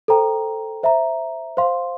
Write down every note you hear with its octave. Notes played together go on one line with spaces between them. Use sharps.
A4 C5 G5 A#5
C5 E5 A#5
C5 F5 C6